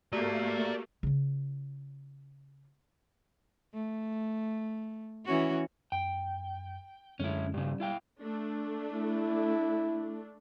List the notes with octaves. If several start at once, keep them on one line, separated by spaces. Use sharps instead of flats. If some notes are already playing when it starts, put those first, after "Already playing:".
A3 A#3 F#4 G4 D5 A#5
C#3 F4
A3
E3 C#4 F#4
F#2 G5
F#2 D3 G#3 C#4 E4
G2 C#3 G3
E4 F5 G5
A3 D4
E4